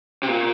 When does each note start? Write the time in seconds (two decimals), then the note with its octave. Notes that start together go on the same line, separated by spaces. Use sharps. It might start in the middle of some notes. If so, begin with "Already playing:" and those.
0.23 C3
0.28 A#2